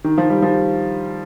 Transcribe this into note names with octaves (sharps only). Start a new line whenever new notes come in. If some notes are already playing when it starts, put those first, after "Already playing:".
D#3
F3
G3
F3